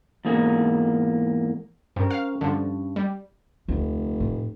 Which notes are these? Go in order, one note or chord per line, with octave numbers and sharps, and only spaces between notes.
E2 G#2 A#3 G#4
G2 C4 C#4 A#4
F5
G2 D3 F3 A5
G3
F1 D2
A2